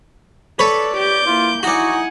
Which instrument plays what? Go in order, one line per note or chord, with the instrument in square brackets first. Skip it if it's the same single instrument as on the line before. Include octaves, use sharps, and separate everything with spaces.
[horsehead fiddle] A4 [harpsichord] B4 C#5 B5 [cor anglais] D5
[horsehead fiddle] G4 [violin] D6 G6
[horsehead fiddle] A#3 E4 [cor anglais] F4
[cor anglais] D#4 [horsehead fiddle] E4 G#5 [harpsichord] F#4 D5 [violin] F#5